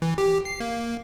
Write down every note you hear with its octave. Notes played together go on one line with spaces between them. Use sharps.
E3
G4
C7
A#3